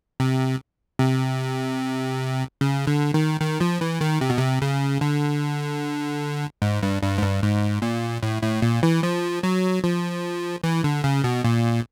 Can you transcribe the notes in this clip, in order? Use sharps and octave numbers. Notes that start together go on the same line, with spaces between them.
C3
C3
C#3
D3
D#3
D#3
F3
E3
D#3
C3
B2
C3
C#3
D3
G#2
G2
G2
G#2
G2
G#2
A#2
A2
A2
A#2
E3
F3
F#3
F3
E3
D3
C#3
B2
A#2